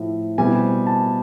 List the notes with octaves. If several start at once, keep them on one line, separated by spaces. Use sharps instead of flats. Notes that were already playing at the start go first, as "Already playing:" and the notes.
Already playing: A2 F3 A3
B2 G3 C4 E4 G#5
A5